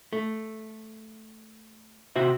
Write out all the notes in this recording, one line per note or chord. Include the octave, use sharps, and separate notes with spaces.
A3
C3 F#4 C5 E5